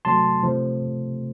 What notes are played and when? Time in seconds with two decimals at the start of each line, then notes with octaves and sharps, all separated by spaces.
0.05 C3 F#3 A3 A5 C6
0.42 C3 F3 A3